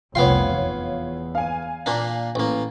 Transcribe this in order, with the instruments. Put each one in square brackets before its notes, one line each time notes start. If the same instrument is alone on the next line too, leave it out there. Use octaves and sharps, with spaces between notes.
[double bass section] F1 C2 [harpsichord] B3 G5 C6 [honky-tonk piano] F4 C#5
[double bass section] E2
[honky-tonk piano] F5 G#5
[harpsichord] A#2 A#3 D4
A1 A#3